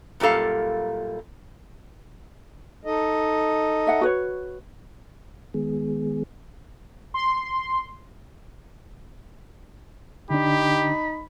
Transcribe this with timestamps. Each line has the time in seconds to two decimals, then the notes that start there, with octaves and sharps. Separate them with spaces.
0.20 F#2 A#2 G3 A4 F5
2.85 D#4 A4 D#5
3.87 E5 F#5
4.01 F#4 B4 C#5
5.54 D#3 G#3 B3 G#4
7.14 C6
10.30 D3 D4 D#4 G4 B5